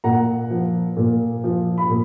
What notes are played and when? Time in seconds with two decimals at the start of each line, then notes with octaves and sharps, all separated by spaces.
0.04 A#2 F#5 A#5
0.51 F3
0.97 A#2
1.44 F3
1.78 B5
1.89 A#2